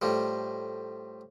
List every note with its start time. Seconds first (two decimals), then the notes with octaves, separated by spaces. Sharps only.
0.02 A2 F3 G3